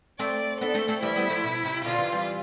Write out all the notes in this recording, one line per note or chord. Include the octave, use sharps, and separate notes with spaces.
A3 C4 D5
B3 D4 A4
A3 C4
A3 C4
E3 G3 E4
G3 B3
F3 A3
B2
C3
B2 D3 F4
C3 E3
E3 G3